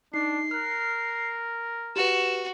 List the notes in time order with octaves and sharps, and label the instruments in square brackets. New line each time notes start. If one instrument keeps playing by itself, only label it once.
[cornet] D4 [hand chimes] D#4 [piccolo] C7
[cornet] A#4 [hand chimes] F6 F#6
[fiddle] F#4 [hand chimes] G4 B4 [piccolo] E7